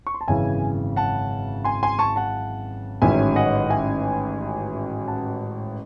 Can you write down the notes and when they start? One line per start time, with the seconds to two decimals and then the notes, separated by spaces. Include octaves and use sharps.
0.07 C#6
0.14 C6
0.21 A5
0.28 G#1 F#2 C#3 E3 E5 G#5
0.96 F#5 A5
1.64 G#5 C6
1.83 G#5 C6
1.99 A5 C#6
2.16 F#5 A5
3.02 A1 G#2 D#3 F#3 C#4 E5 G#5
3.36 D#5 F#5
3.70 E5 G#5
5.08 F#5 A5